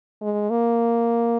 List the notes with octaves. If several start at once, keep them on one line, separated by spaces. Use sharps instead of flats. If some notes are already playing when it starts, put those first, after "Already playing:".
G#3
A#3